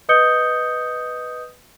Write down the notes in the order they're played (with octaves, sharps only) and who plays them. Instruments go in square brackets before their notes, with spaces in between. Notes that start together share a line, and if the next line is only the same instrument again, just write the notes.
[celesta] B4 D#5 D#6 G6 C#7 G7